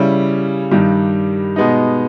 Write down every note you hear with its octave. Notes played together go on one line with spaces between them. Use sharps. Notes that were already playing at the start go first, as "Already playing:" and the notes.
Already playing: C#3 G3 C#4 E4
G2 D#3 G3
B2 G#3 B3 D#4